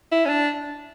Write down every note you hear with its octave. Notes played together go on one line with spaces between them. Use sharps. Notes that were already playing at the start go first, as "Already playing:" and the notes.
E4
C#4
D4